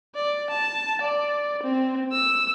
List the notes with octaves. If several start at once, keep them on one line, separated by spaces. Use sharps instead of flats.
D5
A5
D5
C4
E6